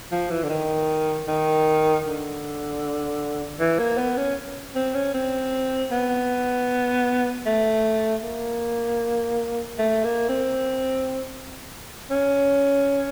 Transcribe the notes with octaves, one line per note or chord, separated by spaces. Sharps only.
F3
E3
D3
D#3
D#3
D3
E3
A#3
B3
C#4
C4
C#4
C4
B3
A3
A#3
A3
A#3
C4
C#4